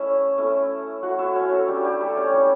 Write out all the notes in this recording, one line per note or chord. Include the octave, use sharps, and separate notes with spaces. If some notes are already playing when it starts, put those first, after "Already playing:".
Already playing: A3 C#4 E4 E5
A3 C#4 E4
A3 E4 F#4 F#5
E4 E5
C#4 C#5
A3 A4
G3 D4 G4
G4
A3 A4
C#4 C#5
G3 C#4 E4